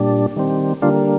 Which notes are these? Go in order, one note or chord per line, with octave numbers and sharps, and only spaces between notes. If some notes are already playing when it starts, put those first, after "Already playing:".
Already playing: A#2 G3 D4
D#3 G3 C4
D3 G3 A#3 D4 F4